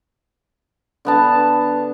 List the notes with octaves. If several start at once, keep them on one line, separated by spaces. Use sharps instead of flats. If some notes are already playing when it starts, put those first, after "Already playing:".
D3 B3 A5